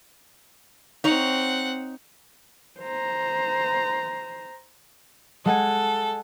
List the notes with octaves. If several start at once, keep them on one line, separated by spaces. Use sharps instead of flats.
C4 D#4 C#5 F#5
C5 A#5
G#3 A4 F#5 G#5